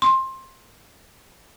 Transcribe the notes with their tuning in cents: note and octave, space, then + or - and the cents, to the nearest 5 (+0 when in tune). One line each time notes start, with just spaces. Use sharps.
C6 +20